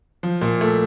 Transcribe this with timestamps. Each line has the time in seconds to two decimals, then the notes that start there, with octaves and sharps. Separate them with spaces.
0.23 F3
0.42 A#2
0.61 A3